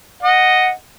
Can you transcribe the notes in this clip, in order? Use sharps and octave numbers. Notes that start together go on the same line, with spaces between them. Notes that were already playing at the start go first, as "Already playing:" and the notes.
D#5 F#5